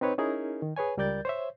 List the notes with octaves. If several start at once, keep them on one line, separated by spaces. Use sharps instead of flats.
C4 D#4 B4 C#5
C#4 D#4 E4 G#4 A#4
D#3
G#4 B4 C#5 G#5
C#2 G3 A#4 D5 G6 A6
C5 C#5 E5